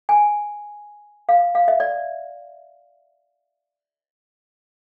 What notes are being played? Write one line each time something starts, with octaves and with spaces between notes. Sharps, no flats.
G#5
F5
F5
E5
D5